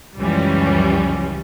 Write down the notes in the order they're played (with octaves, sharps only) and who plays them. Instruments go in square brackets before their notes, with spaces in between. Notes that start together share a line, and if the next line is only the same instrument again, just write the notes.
[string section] C#2 F#2 E3 F3 G3 C#4